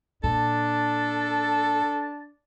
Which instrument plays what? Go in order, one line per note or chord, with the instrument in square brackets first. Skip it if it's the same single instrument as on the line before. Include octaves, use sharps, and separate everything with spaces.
[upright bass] A#2 [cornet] D4 [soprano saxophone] A4 [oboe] A5